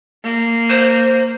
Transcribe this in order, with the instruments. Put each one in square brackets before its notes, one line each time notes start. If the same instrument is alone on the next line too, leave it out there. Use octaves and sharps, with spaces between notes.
[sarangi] A#3
[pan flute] C5